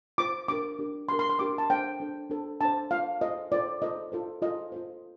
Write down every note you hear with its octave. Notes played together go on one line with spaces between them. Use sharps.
F4 C5 D6
D4 G4 A#4 D6
D4 G4 A#4
D4 G4 A#4 C6
C6
C6
D4 G4 A#4 D6
A5
D4 A4 C5 G5
D4 A4 C5
D4 A4 C5
D4 A4 C5 A5
F4 A4 C5 F5
F4 A4 C5 D#5
F4 A4 C5 D5
F4 A4 C5 D#5
F4 A4 C5
F4 A4 C5 D#5
F4 A4 C5